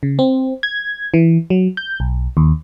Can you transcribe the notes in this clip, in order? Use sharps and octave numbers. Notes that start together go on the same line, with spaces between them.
C#3
C4
G#6
E3
F#3
G6
B1
D#2